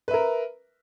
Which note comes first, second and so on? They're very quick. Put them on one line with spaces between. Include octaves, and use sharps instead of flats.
B4 E5 A#4